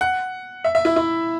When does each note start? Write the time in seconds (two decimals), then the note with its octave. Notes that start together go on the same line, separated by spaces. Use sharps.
0.01 F#5
0.64 E5
0.75 E5
0.85 E4
0.96 E4